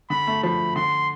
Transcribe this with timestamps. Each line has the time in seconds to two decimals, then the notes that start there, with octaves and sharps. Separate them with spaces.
0.10 D3 B5
0.27 A3
0.43 F3 B5
0.75 D3 C6